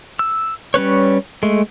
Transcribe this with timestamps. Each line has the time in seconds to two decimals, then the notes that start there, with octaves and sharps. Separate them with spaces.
0.19 E6
0.74 G3 C#4 B4 C#5
1.43 G#3 A3